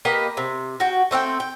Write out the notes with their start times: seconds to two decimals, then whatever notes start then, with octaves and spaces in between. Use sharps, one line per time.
0.05 A#3 G4 B4 D#5
0.37 C3
0.80 F#4 G5
1.11 A3 C4 F5 G5
1.40 G5